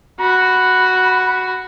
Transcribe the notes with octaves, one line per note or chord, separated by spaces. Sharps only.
F#4 B5